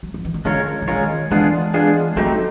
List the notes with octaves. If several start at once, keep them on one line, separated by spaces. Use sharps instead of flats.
F#3
F3
E3
D#3
D3 G#3 C#4 F4 A#4 C#5
D3
D#3 G#3 C#4 F4 A#4 C#5
E3 G#3 B3 D4 F4 G#4
G#3 B3 D4 F4 G#4
F#3 A3 C4 D#4 G4